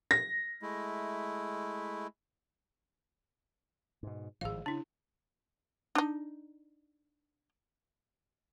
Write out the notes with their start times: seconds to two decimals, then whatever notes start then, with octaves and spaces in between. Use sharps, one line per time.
0.11 A#6
0.62 G#3 A3 E4
4.03 G#2 B2
4.41 G#1 A2 F3 G#4 F5
4.66 C#3 D4 E4
5.95 D4 D#4